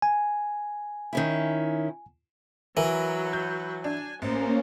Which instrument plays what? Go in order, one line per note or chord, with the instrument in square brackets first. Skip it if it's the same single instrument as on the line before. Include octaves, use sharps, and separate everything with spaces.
[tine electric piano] G#5
[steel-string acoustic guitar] D#3 C#4 E4
[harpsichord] E3 [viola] F#3 B4 [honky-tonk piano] A#4
[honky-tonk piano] G6
[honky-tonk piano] D4 [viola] G#5
[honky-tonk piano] A1 [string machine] A#3 C#4 [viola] A#4 C5